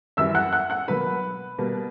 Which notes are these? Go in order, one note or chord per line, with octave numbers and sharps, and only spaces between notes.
F#2 E3 G3 E5 E6
F#5 F#6
F#5 F#6
F#5 F#6
B2 F#3 A#3 B4 B5
B2 G3 A#3